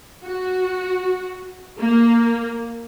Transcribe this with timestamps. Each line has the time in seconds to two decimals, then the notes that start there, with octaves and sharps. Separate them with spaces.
0.24 F#4
1.79 A#3